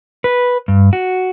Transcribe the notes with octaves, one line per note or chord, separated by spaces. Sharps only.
B4
G2
F#4